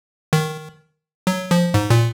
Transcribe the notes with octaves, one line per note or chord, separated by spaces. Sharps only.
D#3
F#3
F3
G#2
A#2